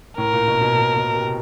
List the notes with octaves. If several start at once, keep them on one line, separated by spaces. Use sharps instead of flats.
A2 A#4
A#2
B2
B2
A#2
B2
C3